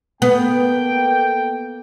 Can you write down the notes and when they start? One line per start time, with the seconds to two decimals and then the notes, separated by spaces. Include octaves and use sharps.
0.22 A#3 B3 A4 G5